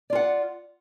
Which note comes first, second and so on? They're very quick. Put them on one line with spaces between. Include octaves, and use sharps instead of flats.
D5 F4 F#5